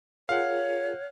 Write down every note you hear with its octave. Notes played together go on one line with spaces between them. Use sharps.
F4 G#4 A#4 C#5 F5 F#5